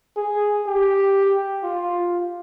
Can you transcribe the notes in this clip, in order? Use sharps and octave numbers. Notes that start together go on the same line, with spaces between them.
G#4
G4
F4